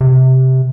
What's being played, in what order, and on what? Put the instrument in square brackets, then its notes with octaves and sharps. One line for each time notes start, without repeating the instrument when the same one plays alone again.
[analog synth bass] C3